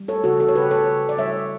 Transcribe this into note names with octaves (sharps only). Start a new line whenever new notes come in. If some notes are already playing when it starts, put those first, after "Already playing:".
Already playing: G3
A4 C#5
C#3 F#4 A4
F#4 A4
C#5
C#3 G4 B4
A4 C#5
C#3
D5
G3 C#5 E5